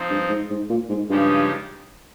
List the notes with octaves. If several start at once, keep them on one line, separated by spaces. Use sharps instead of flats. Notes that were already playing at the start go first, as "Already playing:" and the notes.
Already playing: F3 C4 D#4
G2
G#2
G#2
A#2
G#2
G2 C#3 F3 G#3 D#4 G4